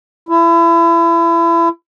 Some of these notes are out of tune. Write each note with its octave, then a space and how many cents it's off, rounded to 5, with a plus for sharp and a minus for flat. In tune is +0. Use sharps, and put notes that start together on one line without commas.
E4 +30